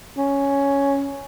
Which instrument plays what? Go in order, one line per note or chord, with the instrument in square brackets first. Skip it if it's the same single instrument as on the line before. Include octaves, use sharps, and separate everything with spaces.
[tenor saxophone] C#4